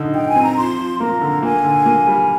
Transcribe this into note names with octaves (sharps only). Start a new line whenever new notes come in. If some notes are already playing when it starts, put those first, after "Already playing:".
Already playing: D3 D#4
D#4 G5
G#5
C4
A#5
F3 C6
F3
A#3 A#5
D3
A#3 G#5
D3
A#3
G3